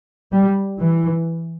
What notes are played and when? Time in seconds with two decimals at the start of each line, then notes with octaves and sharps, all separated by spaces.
0.32 G3
0.79 E3